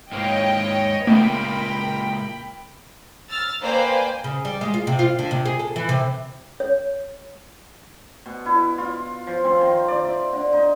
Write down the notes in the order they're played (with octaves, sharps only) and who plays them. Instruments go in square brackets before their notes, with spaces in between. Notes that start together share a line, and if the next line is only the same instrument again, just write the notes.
[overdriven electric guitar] G#2 A#3 [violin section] C#5 D#5 G5
[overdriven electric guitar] C#2 A#2 [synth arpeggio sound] A3 B3 [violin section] A#4 G5 B5
[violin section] E6 F6 A6
A#3 B4 C5 D5 G5 G#5
[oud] C#3
G3
G#3
F4
C3
F4
D3
C3
G#4
A4
E3
C3
[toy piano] C#5
[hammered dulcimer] B2
E4
F4
F3
C4
D#3
D5
E5
D3
D#4